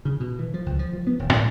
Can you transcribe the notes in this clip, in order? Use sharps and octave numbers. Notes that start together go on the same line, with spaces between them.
C#3
B2
E3
F3
C#2
F3
F3
B3
D#1
G#2